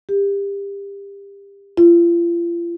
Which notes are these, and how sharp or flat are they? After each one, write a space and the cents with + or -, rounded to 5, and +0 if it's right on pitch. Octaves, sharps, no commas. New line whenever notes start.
G4 +30
F4 -40